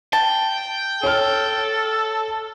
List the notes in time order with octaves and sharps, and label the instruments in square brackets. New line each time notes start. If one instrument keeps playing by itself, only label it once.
[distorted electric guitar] G5 [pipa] A5
[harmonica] A4 [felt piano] C#5 F6